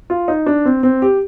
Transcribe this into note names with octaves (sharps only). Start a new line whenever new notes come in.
F4
D#4
D4
C4
C4
G4